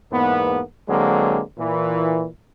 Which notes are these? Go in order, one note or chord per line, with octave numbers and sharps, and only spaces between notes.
E2 G#2 A#3 B3
D3 F#3 G#3 A#3 C4
A#2 E3